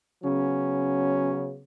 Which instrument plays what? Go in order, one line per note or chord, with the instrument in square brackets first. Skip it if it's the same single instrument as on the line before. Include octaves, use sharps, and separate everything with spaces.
[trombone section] C#3 F#3 B3 C#4